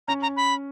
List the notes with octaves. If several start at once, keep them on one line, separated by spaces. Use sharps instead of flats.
C#4 A#5
A#5
B5